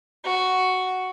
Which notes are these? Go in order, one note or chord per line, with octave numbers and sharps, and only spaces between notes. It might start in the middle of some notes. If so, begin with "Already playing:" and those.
F#4